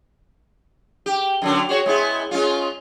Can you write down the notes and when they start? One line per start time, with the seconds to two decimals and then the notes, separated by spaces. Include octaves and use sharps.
1.06 G4
1.42 F#2 D3 F#3
1.69 F#4 G#4 C#5
1.86 G#3 B3 E4
2.31 G#3 C#4 F4